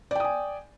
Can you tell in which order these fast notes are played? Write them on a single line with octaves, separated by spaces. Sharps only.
D5 G5 D#6 G#5